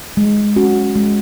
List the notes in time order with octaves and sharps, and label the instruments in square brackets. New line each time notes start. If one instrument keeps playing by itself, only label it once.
[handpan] G#3
C#4 F#4
G#3